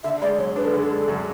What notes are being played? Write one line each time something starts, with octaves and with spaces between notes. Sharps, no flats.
D3 E5
G#3 D5
F#2 C#5
D4 B4
A4
D3 G#4
A4
G#3
F#2